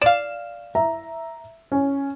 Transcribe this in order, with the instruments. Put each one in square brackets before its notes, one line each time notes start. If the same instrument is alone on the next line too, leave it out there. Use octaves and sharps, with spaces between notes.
[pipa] D5 F5 [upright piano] E7
[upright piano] E5 A#5
C#4